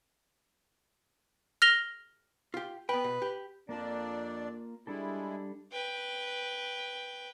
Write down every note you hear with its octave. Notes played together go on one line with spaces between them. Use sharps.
F6 A#6 F7 G7
F4 G4
B3 B4 G5
B2
G4
F2 A#3 D4 F4 D5 A5
G3 G#3 D4 E4 A4
B4 G5